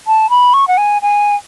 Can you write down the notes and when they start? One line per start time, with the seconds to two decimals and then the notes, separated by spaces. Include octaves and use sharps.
0.07 A5
0.30 B5
0.54 C#6
0.68 F#5
0.77 G#5
1.02 G#5